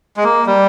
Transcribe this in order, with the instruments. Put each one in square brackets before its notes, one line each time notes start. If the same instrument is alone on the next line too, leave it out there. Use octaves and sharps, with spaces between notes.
[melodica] G#3
A#3
G3